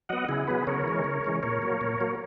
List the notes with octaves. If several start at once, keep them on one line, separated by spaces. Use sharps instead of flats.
F#3 B3 D#5 F#5
C#3 E4 G#4
F#3 B3 G#4 B4
C#3 A#4 C#5
E3 G#3 C#4
C#3
E3 G#3 C#4
A#2 A#4 C#5
F#3 A#3
A#2
F#3 A#3